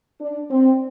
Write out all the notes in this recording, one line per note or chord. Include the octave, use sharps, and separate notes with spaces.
D4
C4